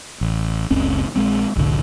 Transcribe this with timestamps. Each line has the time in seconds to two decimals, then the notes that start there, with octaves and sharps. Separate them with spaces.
0.21 A1
0.70 F#1 C#2 C4 C#4
1.16 A#1 G#3 C4
1.56 F1 C2 A2 D3